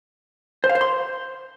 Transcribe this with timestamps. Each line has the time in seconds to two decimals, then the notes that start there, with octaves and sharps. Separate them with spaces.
0.64 C5
0.69 F5
0.75 C5
0.81 C6